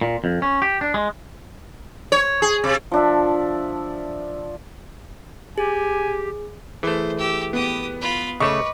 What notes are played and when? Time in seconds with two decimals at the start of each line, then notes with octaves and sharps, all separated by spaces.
0.01 A#2
0.24 F2
0.42 C#4
0.62 G4
0.81 D4
0.94 G#3
2.12 C#5
2.42 G#4
2.64 C3
2.91 F3 D4 E5
5.58 G4 G#4 G#5
6.83 E3 A3 G#4 C5
7.18 G4 E6
7.53 B3 G4 D#6
8.01 F4 B5
8.40 C#3 A3 B4 C#5 D#5 C#6 D6